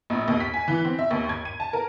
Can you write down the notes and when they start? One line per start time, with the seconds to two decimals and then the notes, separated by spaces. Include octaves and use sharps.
0.10 A#1
0.28 D#2
0.40 B6
0.54 G#5
0.68 E3
0.85 C4
0.99 E5
1.11 D#2
1.29 G#6
1.45 D#7
1.60 A5
1.73 A#4